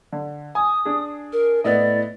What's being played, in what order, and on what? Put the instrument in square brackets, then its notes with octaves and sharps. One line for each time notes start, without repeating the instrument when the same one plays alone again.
[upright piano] D3
[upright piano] G#5 [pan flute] D#6
[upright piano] D4 G#4
[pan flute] A#4
[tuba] A2 [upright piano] B3 E4 D#5 [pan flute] D5